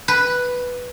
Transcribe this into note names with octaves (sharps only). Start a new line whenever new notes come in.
B4